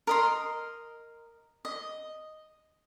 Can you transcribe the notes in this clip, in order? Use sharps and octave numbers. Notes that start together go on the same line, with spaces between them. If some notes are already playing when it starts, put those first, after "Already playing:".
A#4 D#5 C6
D#5